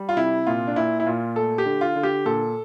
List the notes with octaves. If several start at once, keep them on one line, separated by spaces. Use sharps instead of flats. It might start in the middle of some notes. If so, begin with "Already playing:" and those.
Already playing: G3
F4
C3 E4
A#2 F4
D4
A#2 E4
E4
A#2 F4
A3 A4
G4
D3
F4
D3
G4
A#2 A4